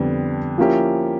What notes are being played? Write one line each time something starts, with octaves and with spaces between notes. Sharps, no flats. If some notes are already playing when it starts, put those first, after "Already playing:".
Already playing: F2 D3 G3 B3
F3 A#3 C#4 E4 G4